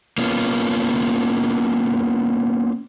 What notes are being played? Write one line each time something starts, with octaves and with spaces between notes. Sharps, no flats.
A#3 B3 C#4 F4